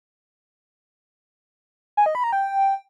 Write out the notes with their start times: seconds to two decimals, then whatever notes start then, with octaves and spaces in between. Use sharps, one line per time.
1.97 G#5
2.06 D#5
2.15 B5
2.24 A#5
2.32 G5